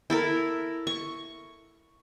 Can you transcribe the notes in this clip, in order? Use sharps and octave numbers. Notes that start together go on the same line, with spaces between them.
E4 A4 A#4
C#6